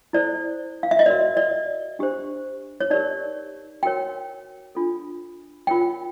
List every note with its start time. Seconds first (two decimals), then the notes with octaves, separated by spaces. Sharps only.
0.13 E4 A4 C5 D5
0.83 F5
0.91 E5
0.99 D#5
1.06 F#4 A#4 C#5 D5
1.37 D5
1.99 D4 G4 C5
2.81 C#5
2.90 D#4 G4 A#4 D5
3.83 F#4 A#4 C#5 G5
4.75 D4 F4 A4
5.67 F4 A#4 C#5 G5